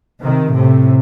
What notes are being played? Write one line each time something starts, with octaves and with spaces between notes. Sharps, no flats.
C3 D#3
A2 C3